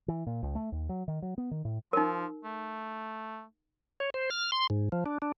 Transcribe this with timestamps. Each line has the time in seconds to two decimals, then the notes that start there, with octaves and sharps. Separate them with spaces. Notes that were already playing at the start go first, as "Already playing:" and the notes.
0.08 E3
0.27 A#2
0.43 C#2
0.55 A3
0.72 D#2
0.89 F#3
1.08 D#3
1.22 F#3
1.38 B3
1.51 D#3
1.65 A2
1.93 F3 D#4 A#4
2.44 A3
4.00 C#5
4.14 C5
4.30 F6
4.52 C6
4.70 G#2
4.92 F3
5.06 D4
5.22 D4